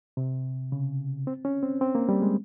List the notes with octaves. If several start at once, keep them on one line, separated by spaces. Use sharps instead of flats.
C3
C#3
C4
C#4
C4
C4
A#3
G3
G#3